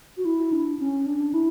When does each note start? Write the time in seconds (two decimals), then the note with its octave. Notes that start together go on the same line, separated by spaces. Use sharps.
0.17 F#4
0.25 E4
0.52 D4
0.79 C#4
1.06 D4
1.34 E4